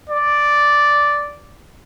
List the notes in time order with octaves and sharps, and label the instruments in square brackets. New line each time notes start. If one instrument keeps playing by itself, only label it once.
[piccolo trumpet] D5